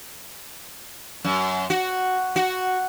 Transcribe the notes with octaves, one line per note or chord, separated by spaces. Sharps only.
F#2
F#4
F#4